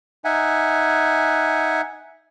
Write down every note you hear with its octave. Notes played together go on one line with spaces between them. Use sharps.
D#4 E5 F#5 G#5